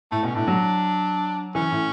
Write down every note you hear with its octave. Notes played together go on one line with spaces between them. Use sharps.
A2 A3
B2 C#4
A2 D4
F#3
E3 C#4
A2